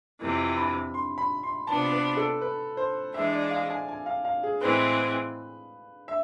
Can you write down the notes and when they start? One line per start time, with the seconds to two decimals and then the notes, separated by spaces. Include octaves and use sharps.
0.20 F2 C3 E3
0.57 B5
0.94 C6
1.18 B5
1.43 C6
1.67 C3 F3 B3 D4 A5
1.92 B4
2.17 A4
2.41 B4
2.77 C5
3.14 E3 G#3 D4 G#4 E5
3.32 D5
3.51 F5
3.70 G#5
3.88 G#5
4.06 F5
4.25 F5
4.43 G#4
4.61 A2 E3 G#3 C4 B4
6.08 E5